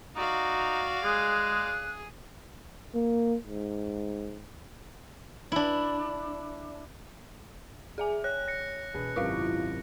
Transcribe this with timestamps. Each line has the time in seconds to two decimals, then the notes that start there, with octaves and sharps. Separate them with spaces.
0.16 D#4 F#4 D5 F5
1.04 G#3 G#4 F#6
2.95 A#3
3.46 G#2
5.52 D4 E4
7.98 G#4 E5 G#5
8.24 C#5 F#6
8.48 A#6 C#7
8.94 E1 G#4 B4
9.16 G#1 F#2 C3 E4 F4 F5